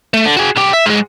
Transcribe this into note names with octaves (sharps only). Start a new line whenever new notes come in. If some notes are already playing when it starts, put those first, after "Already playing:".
A3
D3
F#4 G#4
B1 G4
E5
G#2 G#3